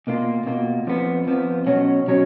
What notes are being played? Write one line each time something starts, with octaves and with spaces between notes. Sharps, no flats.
B2 A#3 F4
B2 A#3 F4
F2 F3 B3
F2 F3 B3
B2 F#3 C#4 F#4
B2 F#3 C#4